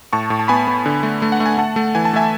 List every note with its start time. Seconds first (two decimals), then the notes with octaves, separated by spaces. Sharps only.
0.13 A2 A5 C#6
0.30 A2
0.39 A5
0.48 B3 G#5 B5
0.67 B3
0.86 D3
1.03 A3
1.22 A3
1.32 F#5
1.40 A3
1.46 G#5
1.58 A3 F#5 A5
1.76 A3
1.95 E3 G#5
2.05 A5
2.13 A3 E5 G#5